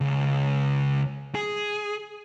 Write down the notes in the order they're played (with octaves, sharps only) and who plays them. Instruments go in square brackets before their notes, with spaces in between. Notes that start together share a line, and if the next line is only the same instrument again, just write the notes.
[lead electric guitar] C#2
G#4